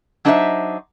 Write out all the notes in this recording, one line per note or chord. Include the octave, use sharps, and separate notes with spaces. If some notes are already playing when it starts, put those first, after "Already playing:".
F#3 D4 D#4 C5 C#5 E5